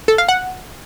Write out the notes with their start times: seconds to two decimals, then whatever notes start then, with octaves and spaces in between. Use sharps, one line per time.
0.08 A4
0.18 F5
0.29 F#5